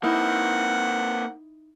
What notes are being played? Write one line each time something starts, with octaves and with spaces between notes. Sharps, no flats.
A#3 C4 D#4 E4 F#5